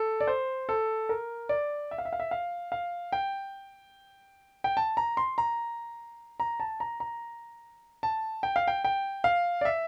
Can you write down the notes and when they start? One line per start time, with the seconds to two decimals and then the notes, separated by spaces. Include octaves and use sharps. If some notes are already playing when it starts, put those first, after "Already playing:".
Already playing: A4
0.21 D5
0.27 C5
0.69 A4
1.09 A#4
1.49 D5
1.91 E5
1.98 F5
2.05 E5
2.13 F5
2.20 E5
2.31 F5
2.72 F5
3.12 G5
4.64 G5
4.77 A5
4.97 A#5
5.17 C6
5.38 A#5
6.40 A#5
6.60 A5
6.80 A#5
7.00 A#5
8.03 A5
8.43 G5
8.56 F5
8.68 G5
8.84 G5
9.24 F5
9.61 D5
9.65 E5